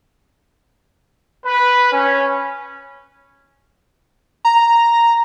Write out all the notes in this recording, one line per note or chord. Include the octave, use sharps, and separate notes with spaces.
B4
C#4
A#5